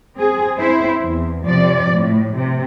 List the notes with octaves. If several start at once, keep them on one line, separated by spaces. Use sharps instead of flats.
C4 G#4
C4 E4 C5
E2
C3 F3 D5
A2
C3